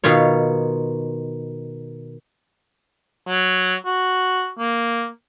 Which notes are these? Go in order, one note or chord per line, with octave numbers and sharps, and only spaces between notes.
B2 D#3 F4 C#5
F#3
F#4
A#3